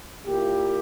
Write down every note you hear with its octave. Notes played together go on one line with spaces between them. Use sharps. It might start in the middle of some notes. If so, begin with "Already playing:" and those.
A#2 A#3 E4 G4